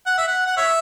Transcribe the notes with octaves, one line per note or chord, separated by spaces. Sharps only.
F#5
E5
F#5
F#5
C#5 E5